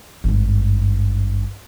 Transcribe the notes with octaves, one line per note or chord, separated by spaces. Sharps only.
G#1 G2